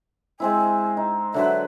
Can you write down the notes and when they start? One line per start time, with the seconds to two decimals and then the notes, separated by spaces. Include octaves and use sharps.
0.40 G#3 C4 E4 G#5
0.97 D#4
1.34 D3 F#3 B4 E5